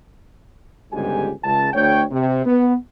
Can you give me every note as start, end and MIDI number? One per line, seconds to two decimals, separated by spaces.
0.92 1.30 31
0.92 1.30 37
0.92 1.30 44
0.92 1.30 67
0.92 1.30 80
1.43 1.69 37
1.43 1.69 81
1.73 2.03 38
1.73 2.03 73
1.73 2.03 79
2.11 2.44 48
2.45 2.74 59